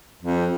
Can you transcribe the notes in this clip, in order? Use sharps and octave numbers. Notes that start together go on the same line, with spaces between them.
F2